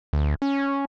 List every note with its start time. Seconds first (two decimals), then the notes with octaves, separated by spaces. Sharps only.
0.13 D2
0.42 C#4